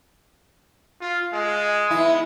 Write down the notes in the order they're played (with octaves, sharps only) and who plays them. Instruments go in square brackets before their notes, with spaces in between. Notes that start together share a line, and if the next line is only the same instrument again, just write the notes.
[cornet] F4
G#3
[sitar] B3 E4